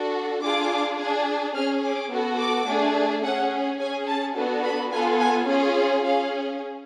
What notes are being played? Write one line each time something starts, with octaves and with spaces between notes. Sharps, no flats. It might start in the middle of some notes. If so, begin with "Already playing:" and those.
Already playing: D4 F#4 A4
D4 F4 G#4 D6
D4 G#4
C#4 G#4 F6
D6
B3 F#4 A4
D6
A3 D4 G#4
C#4 G#4 F#5
C#4 G#4 G#5
A5
B3 D4 F#4 A4
B5
B3 F4 A4 G#5
G#5
C#4 F4 G#4
C#4 G#4 F5